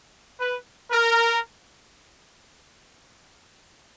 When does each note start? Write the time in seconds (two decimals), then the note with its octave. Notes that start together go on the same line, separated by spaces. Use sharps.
0.39 B4
0.91 A#4